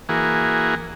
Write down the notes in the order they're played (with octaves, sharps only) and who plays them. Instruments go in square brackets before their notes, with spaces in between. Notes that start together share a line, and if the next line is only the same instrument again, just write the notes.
[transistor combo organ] E3 A#3 F#4 G#4